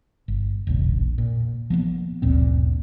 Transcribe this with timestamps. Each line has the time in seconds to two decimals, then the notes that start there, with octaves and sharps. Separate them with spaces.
0.28 G1
0.67 E1 A#1 C#3
1.18 A#2
1.70 F3 A#3 B3
2.22 G1 D2 A#2 C4